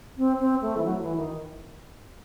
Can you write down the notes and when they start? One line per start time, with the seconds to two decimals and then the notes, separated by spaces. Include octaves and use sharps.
0.17 C4
0.39 C4
0.62 A3
0.77 E3
0.85 F#3
1.01 E3
1.17 D#3